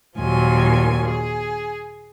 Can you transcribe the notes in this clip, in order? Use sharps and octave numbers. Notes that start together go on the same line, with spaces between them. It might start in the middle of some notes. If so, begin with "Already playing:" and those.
D#2 A#2 F3 F#3 G#5
G#4